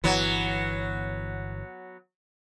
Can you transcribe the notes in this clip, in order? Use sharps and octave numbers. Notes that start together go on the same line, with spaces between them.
G1 E3 F#3 B3